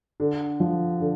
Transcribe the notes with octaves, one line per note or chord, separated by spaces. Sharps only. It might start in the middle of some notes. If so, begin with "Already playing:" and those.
D3
F3
D3